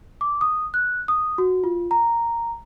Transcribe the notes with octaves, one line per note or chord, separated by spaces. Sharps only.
D6
D#6
F#6
D#6
F#4
F4
A#5